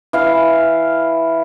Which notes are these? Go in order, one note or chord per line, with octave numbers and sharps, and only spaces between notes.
E3 F5